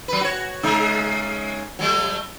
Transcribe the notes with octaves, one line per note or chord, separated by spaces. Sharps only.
F#3 B4
F#4 C#5
C#3 G#3 D#4
F#3 G3 A3